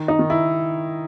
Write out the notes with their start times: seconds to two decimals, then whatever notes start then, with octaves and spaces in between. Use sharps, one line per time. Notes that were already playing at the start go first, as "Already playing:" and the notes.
Already playing: D#3
0.08 D#4
0.19 D#3
0.30 E4